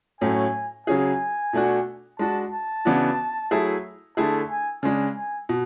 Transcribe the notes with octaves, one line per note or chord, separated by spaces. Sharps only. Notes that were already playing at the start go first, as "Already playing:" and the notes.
A2 F#3 A3 C#4 G#5
C#3 F#3 C#4 G#4 G#5
B2 A3 D4 F#4
G#3 D4 F#4 A5
A5
C#3 E3 B3 D4 F#4
F#3 A3 E4 G#4
D3 A3 E4 G#4 A5
G#5
C#3 G#3 D4 G#5
G#5
B2